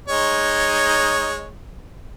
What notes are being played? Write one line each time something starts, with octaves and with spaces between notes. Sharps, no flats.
G#3 D#4 C#5